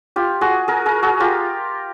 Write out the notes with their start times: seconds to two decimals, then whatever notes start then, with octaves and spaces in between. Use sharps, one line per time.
0.16 F4 G4
0.41 F#4 G#4
0.68 G#4 A#4
0.86 G#4 A#4
1.03 F#4 G#4
1.20 F4 G4